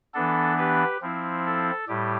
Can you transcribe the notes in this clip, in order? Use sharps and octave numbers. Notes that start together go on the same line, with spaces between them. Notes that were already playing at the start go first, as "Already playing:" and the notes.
E3 B3 D4 A4
G4 B4
F3 C4 E4
A4
A2 G3 G4